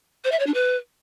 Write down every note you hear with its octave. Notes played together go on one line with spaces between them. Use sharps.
C5
E5
C#5
D4
B4